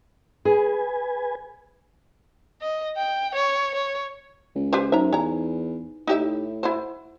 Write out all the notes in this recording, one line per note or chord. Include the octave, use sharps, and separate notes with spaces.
G#4 B4 G#5
D#5
G5
C#5
C#5
C#2
G4 B4 C5
F#2 D#4 C5 E5 A#5
E2 C#5 G#5 A#5
A2 D#4 G4 E5
E4 F#4 C5